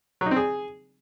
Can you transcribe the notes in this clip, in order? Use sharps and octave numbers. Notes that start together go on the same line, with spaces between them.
F#3
D#4
C4
G#4